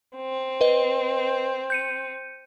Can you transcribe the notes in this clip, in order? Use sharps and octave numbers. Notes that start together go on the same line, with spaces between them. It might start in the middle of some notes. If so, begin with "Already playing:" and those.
C4
B4 D#5
G6 C#7 D#7